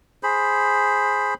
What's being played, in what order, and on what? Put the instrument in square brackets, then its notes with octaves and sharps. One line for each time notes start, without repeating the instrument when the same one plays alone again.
[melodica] G#4 C5 B5